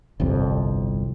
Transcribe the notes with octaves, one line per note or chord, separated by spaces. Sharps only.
G1 C2 F2